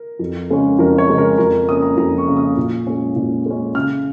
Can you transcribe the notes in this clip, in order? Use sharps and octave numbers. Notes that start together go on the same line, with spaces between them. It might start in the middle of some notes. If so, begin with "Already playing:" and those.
Already playing: A#4
F2
C#3 G#3 C#4
F2 A#4
C#5
C#3 G#3 C#4
A#4
F2 A#4
C#3 A#3 C#4 D#6
A#5
F2 A#5
C#6
C#3 A#3 C#4
D#6
A#2
G#3 C#4
A#2
G#3 C#4
C#3 F6